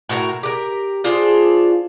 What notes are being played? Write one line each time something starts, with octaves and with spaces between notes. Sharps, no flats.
A2 F#4 A#4 A#5
G4 A#4
D4 F4 G#4 C5